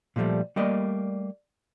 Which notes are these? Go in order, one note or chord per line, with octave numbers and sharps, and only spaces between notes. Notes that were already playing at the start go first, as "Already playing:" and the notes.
A#2 D3 F3 G3 A3
G3 A3 A#3 D5 D#5